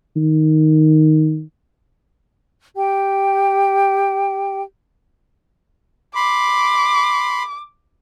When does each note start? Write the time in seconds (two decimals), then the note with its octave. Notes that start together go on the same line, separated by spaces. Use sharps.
0.16 D#3
2.75 G4 G5
6.15 B5 C6 D6